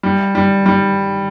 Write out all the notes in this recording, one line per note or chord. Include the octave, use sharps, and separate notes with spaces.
G3
G3
G3